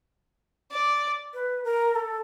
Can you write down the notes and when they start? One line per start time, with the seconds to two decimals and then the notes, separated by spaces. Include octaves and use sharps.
0.71 D5
1.34 B4
1.64 A#4
1.95 A4